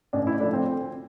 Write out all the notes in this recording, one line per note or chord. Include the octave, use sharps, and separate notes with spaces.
A1 D4
E4
A2 F3 D4
C4
D2